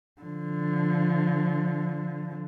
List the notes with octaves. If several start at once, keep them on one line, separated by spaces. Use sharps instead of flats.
D3 F3